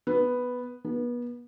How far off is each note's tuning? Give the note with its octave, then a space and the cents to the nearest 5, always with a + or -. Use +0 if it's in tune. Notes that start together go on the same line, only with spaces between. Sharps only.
B3 +0
B3 -30